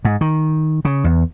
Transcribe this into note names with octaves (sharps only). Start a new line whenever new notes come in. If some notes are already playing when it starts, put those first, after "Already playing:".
G#2
D#3
C#3
E2